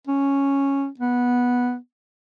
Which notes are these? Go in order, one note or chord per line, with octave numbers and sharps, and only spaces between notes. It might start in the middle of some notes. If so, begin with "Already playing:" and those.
C#4
B3